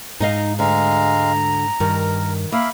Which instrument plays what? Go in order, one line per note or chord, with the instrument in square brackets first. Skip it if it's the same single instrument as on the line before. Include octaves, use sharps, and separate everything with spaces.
[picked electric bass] G#2 [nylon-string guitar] D#4 D#5 F5 [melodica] A#5
[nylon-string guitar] D2 D3 [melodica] G#3 F5 [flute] A#5
[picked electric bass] G2 [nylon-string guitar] D#3 [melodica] A#4
[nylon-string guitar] A#3 [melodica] E5 F5 [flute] B5